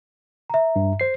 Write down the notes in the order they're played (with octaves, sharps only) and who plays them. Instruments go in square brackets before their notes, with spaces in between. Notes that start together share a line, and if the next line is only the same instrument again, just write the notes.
[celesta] E5 A#5
[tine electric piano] G2
C5 C7